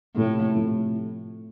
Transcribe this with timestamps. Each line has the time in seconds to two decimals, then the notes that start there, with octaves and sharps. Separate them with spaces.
0.15 A2 C3 F3 A3
0.55 C3 F3 A3